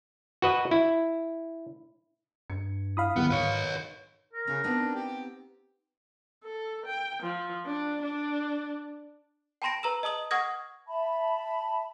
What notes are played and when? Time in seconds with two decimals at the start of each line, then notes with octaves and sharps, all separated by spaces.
0.42 F#4 B4 D#5
0.71 E4
2.50 G2 G#6 C#7
2.97 E4 F5 B5 D#6
3.16 D1 D#3 G3 B3 E6
3.31 G#2 D#3 B4 C#5
4.34 A#4
4.47 C#3 C#4
4.64 B3 C4 D4 D#4
4.95 G4
6.44 A4
6.86 G5
7.23 F3
7.66 D4
8.02 D4
9.62 G5 A5 B5 C6 A#6 D7
9.83 B4 A#5 E6 E7
10.03 D#5 A5 D#6 F#7
10.31 F#5 C#6 D#6 F6 G#6 A#6
10.88 E5 A5 B5